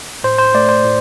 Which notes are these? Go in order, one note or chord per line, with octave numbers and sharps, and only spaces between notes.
A2 C5
C5
A3 D5
C5
A2